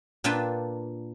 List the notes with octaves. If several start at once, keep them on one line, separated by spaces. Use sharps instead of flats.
A#2 D4 F4 B4 G5 A5